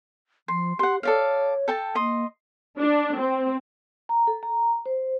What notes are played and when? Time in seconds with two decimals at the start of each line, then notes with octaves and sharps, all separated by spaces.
0.48 F3 C6
0.79 G4 F#5 C6
1.03 A4 C#5 D5 F5
1.68 A4 G5 A5
1.95 A#3 D#5 C6
2.78 D4
3.18 C4
4.09 A#5
4.27 A4
4.43 A#5
4.86 C5